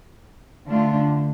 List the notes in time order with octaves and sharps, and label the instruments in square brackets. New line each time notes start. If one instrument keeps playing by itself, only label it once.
[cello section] D3 A3 D4 F4